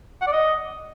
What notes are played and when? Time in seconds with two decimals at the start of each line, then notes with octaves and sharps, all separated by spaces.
0.22 F#5
0.27 D5
0.32 D#5